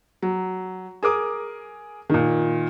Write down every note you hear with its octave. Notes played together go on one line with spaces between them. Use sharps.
F#3
G#4 A#4 D6 D#6
A#2 D#3